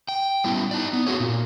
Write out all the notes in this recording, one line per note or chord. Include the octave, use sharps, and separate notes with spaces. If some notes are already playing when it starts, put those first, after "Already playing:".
G5
G3 B3 E4
D#4 D5
B3
C4 C#4 F#4 G#4 C#5
A#2